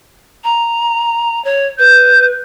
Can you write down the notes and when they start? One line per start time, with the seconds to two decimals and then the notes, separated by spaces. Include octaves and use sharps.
0.44 A#5
1.45 C#5
1.79 B4 G6